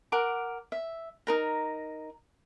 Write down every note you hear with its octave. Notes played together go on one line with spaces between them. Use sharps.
A#4 F#5 D6
E5
D#4 A#4 A#5